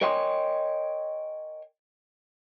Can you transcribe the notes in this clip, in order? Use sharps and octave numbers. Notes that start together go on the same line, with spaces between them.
A#4 C#5 D#5 G5 G#5 C6